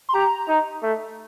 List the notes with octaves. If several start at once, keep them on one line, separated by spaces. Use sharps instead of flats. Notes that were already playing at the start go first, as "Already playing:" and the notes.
C6
G4 A#5
D#4
A3